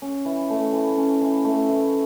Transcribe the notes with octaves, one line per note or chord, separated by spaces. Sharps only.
C#4
E3
A3
E3
C#4
E3
A3
E3